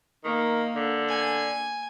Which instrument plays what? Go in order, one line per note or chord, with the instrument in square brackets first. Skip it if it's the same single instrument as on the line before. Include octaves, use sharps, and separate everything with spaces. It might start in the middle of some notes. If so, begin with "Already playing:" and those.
[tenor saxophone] D#3 [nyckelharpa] A#3
[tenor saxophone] D3
[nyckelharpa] G#5